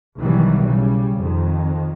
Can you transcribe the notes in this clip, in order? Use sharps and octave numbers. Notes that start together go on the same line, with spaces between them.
B1 D#3 E3 F#3 G3
C#3 G3
F2 D#3